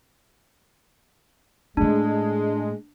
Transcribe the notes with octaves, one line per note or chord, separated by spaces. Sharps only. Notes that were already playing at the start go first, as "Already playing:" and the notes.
A2 G#3 A3 D4